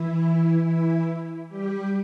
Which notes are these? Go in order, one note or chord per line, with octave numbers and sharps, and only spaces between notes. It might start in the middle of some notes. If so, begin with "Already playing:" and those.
Already playing: E3 E4
E3 E4
G3 G4